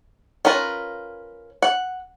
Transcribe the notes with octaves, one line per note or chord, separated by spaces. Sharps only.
C#4 F4 A#4 B4
F#5